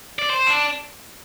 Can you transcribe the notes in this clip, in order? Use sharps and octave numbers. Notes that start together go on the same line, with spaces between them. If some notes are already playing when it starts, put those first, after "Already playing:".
D5
C5
D4